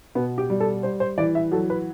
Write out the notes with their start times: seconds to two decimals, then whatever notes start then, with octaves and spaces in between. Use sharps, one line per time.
0.15 B2 B3
0.38 G4
0.50 G3
0.60 A4
0.83 G3 C5
1.00 C5
1.18 E3 D5
1.35 E5
1.52 F#3 A4
1.70 B4